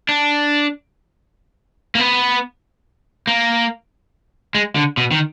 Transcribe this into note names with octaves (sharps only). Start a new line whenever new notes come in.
D4
A#3
B3
A#3
G#3
D3
B2
D#3